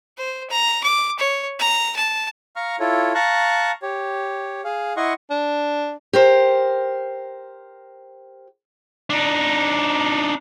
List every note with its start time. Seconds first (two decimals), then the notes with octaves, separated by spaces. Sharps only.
0.18 C5
0.50 A#5
0.84 D6
1.19 C#5
1.59 A#5
1.96 A5
2.56 F5 A#5 C#6 F6
2.80 E4 F4 A4 C#5
3.14 F5 A5 A#5 C#6 F#6
3.82 G4 C#5
4.64 G#4 F5
4.97 E4 D#5 F#5 C6 C#6
5.31 D4
6.13 G4 A#4 C5
9.10 D4 D#4